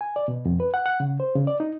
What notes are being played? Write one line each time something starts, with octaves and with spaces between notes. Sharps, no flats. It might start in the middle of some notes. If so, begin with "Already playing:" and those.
G#5
D5
B2
F2
B4
F#5
F#5
C#3
C5
C#3
D5
D#4